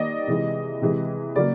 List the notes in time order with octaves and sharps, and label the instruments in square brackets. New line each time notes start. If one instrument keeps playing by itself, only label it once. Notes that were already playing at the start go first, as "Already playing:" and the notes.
Already playing: [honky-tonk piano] D#3 G3 A#3 D5 D#5
C3 E3 G#3
C3 E3 G#3
C#3 F#3 A#3 D5